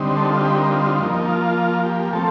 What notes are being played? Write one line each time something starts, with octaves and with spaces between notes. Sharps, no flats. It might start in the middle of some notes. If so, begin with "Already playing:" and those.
Already playing: D3 G3 C4 D#4
A4
F4
G4
A#4
F4
F4
F3 A#3 D#4
D#4
F4
G4
F3 A3 C4 A4